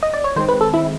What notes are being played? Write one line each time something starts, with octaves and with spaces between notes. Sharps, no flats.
D#5
D5
C#5
D#3 G#3 C4 C5
B4
A4
E4